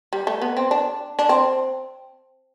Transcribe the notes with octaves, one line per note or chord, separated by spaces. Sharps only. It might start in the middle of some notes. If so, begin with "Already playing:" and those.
G3
A3
B3
C4
D4
D4
C4